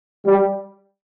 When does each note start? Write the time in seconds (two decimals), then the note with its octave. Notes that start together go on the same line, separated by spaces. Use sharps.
0.26 G3